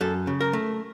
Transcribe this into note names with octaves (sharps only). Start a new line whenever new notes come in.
F#2 A4
C#3
A#4
A3